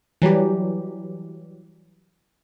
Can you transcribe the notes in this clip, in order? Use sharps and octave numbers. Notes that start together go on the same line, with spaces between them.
E3 F#3 G3 G4